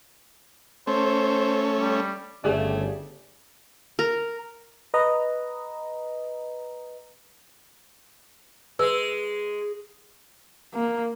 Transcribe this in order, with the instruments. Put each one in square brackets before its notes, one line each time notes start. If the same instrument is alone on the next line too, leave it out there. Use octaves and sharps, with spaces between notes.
[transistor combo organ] A3 C#4 [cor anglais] C5
[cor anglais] G3
[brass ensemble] G1 C#3 [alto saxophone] A3 [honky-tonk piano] G4 G#4 D5
[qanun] A#4
[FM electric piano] B4 D#5 A#5
[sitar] G#3 [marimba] B4 E6
[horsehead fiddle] A#3